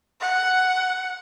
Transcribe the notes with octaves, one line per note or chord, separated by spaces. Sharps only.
F#5